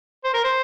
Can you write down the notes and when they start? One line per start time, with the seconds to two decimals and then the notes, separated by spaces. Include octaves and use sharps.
0.24 C5
0.34 A#4
0.44 C5